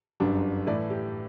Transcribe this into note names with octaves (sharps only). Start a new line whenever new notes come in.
G1 F#2 D3 G3 D4
A2 E3 A3 E4 B4 D5
G4